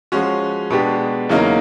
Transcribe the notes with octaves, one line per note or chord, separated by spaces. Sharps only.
F3 G#3 C#4 F#4
B2 G#3 B3 D4 G4
E2 C#3 F#3 A#3 D#4